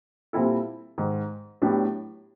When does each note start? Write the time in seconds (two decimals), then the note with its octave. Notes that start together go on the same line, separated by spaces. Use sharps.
0.33 A#2 G3 C4 E4 A4
0.98 G#2 D#3 G#3
1.62 A2 F#3 B3 D4 G4